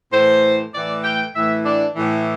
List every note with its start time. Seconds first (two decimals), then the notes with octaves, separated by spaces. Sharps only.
0.13 A2 E3 C5
0.74 A2 E3 D5
1.04 G5
1.35 A2 E3 E5
1.66 D4
1.96 A2 E3